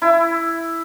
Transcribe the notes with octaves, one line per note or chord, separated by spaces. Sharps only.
E4